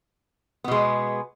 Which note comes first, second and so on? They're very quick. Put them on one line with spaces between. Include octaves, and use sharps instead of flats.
B3 B2 G#3